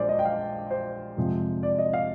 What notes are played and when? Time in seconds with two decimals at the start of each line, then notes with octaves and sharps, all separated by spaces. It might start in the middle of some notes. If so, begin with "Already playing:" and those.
Already playing: A#1 A#2 G#3 C5 D5
0.09 D#5
0.19 G5
0.25 F5
0.71 C5
1.17 F2 C3 F3 G#3
1.63 D5
1.78 D#5
1.93 F5